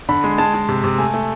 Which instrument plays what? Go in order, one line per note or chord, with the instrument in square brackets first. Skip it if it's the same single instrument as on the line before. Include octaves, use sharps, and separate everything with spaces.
[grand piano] D3 B5
G#3
G#3 A5
G#3
C3
C3
A3 G#5
A3